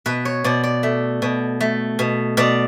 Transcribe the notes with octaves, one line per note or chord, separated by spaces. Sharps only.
B2 B4
C#5
B2 D5
D5
A3
B2
A3
B2
B2 D5